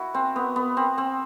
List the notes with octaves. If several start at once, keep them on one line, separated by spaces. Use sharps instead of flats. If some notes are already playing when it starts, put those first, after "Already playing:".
Already playing: E4 F#4
C4
B3
B3
C4
C4